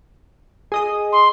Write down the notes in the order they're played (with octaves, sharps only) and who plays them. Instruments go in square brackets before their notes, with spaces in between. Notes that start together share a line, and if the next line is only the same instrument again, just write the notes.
[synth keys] G#4 D#5 D#6
[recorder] C6